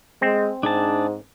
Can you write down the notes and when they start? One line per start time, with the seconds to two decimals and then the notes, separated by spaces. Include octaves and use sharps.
0.22 G#3 C4
0.63 G#2 D4 G#4 A5